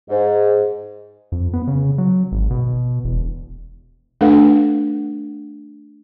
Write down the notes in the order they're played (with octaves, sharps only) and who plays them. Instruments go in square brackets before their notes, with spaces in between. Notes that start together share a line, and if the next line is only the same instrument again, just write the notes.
[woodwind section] G#2
[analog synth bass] F2
B3
C#3
F#3
G#1
B2
E1
[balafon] A3 D4 A4 B4 F5 F#5